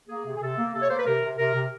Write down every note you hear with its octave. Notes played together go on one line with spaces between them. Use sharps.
A#3 G#4
C3
G#4
C3 A4
A#3
C3 A4
C#5
A#3 C5
B4
C3 A#4
C3
C3 A#4
C3